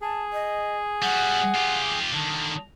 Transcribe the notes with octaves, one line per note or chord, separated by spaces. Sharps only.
G#4 A5
D#5
G3 F#4 F#5
F4 G4
D3 D#3 A5